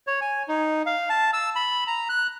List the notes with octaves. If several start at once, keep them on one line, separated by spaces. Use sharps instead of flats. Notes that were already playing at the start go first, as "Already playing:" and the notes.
C#5
G#5
D#4
F5
A5
E6
B5
A#5
F#6